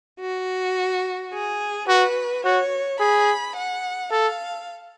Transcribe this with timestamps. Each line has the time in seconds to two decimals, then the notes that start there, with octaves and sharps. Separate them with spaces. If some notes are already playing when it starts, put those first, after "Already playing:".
0.20 F#4
1.32 G#4
1.88 F#4 B4
2.44 F#4 C#5
3.00 G#4 B5
3.56 F#5
4.11 A4 F5